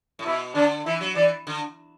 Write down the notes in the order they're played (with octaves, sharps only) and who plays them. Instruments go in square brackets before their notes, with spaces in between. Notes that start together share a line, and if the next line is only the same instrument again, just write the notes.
[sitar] A2
[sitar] B2 [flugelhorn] E4
[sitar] D3 [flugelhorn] D4
[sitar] E3 [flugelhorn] E4
[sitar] F#3
[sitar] E3 [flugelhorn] D5
[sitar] D3